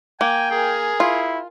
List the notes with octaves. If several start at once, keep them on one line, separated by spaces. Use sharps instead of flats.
A#3 G5 G#5
G#4 A#4 G#5
E4 F4